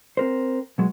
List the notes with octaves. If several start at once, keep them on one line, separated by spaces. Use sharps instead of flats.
C4 A#4 C5
B2 F#3 G#3